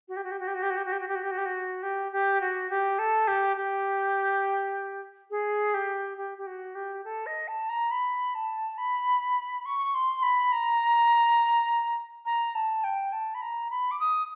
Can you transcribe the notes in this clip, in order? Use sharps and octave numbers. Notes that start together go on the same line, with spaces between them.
F#4
G4
F#4
G4
F#4
G4
F#4
G4
F#4
G4
F#4
G4
F#4
G4
F#4
G4
F#4
G4
F#4
G4
G4
F#4
G4
A4
G4
G4
G#4
G4
G4
G4
F#4
G4
A4
D#5
A5
A#5
B5
A5
B5
C#6
C6
B5
A#5
A#5
A5
G5
A5
B5
A#5
B5
D6
D#6